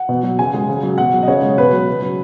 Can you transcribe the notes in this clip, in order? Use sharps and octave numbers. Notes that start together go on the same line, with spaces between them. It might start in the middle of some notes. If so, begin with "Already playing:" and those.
Already playing: F#5
B2
F#3
C#3 G#5
G#3
C#3
F#3
B2 F#5
F#3
D#5
C#3 C#5
G#3
B2 B4
F#3
C#3
F#3